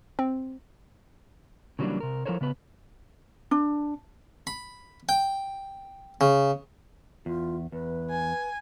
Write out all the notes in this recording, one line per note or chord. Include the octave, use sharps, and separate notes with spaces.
C4
C#3 E3 F#3 G3 A#3 D4
C3 A#4
F3 E4 A4 A#4 C5 C#5
C#3 B3 B4
D4
B5
G5
C#3
E2 F4
E2 B4
G#5